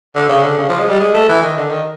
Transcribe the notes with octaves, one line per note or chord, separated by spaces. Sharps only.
D3
C#3
D3
C#3
F3
G#3
G3
G#3
A3
E3
D#3
D3
D#3